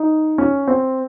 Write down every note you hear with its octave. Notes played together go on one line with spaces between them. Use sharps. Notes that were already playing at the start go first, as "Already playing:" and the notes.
Already playing: D#4
C#4
C4